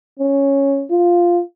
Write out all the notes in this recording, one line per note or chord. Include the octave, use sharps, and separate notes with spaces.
C#4
F4